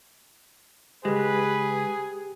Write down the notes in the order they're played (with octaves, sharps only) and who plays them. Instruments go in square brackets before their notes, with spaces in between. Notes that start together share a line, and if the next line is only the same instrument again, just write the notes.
[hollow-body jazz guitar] C#2 G#3 [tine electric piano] G4 [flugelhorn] G#4 [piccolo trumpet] B4